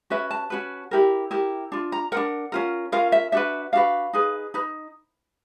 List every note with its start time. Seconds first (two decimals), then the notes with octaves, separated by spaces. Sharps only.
0.10 C#4 F#4 B4 E5
0.31 A5
0.50 C#4 F#4 B4
0.91 E4 G4 A#4
1.31 E4 G4 A#4
1.72 D4 F4
1.92 A#5
2.12 D4 F4 A#4 F#5
2.52 C#4 F4 A#4
2.92 C#4 F4 A#4 F5
3.12 E5
3.32 D4 F#4 B4 E5
3.73 D4 F#4 B4 F5
4.13 D#4 G#4 B4
4.54 D#4 B4